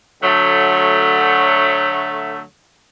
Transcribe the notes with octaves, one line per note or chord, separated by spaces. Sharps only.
D3 F#3 A3